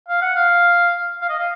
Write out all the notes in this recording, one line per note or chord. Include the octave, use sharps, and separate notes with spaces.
F5
F#5
F5
F5
D#5
F5